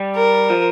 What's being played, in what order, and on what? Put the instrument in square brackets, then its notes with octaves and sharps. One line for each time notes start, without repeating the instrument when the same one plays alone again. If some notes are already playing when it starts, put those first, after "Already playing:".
Already playing: [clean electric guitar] G3
[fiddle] A#4
[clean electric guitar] F3